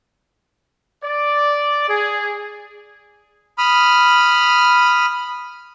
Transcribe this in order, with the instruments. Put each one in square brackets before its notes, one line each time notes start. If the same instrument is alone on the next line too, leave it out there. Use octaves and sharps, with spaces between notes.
[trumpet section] D5
G#4
[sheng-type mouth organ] B5 D#6 F6